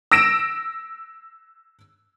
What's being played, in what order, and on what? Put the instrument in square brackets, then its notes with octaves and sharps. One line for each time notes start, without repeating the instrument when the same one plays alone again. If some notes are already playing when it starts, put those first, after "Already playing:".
[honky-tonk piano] E6 A#6 D7 E7